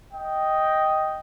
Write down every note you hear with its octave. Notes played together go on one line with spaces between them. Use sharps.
D#5 G5